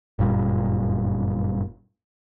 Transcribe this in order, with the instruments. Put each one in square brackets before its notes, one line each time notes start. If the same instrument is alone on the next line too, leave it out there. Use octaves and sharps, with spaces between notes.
[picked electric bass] G1 F#2 A#2 G3